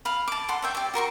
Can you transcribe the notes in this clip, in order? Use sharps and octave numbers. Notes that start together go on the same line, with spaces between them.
F5 B5
A5 D6
A4 F#5 C6
C#5 E5 G5
G4 D5
F#4 A#4 C6 C#6